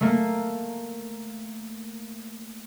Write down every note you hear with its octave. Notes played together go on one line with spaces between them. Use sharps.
A3 A#3